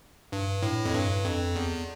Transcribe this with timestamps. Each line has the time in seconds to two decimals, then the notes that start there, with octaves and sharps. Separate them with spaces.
0.32 G2
0.62 A2
0.85 F2
0.94 G2
1.25 F2
1.55 E2